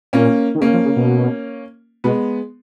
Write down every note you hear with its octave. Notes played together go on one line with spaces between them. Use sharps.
A#2 A#3 C#4
D#3
C#3 A#3 C#4
F3
C#3
B2
B2 G#3 B3